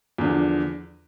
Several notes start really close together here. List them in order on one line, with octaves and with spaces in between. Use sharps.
E2 D3 F3